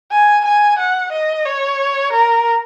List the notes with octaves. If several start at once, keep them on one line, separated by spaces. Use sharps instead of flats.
G#5
G#5
F#5
D#5
C#5
A#4